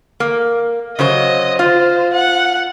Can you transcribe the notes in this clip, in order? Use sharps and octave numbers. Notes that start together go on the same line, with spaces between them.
A#3
C#3 F#3 C5 D#5
F4 C5
F#5